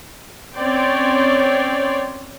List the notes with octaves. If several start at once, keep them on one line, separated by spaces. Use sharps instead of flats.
C4 C#4 C#5 D5 G5 C6